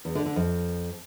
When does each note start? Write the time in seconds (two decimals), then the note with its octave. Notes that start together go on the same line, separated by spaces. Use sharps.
0.05 E2
0.15 D3
0.26 D3
0.36 F2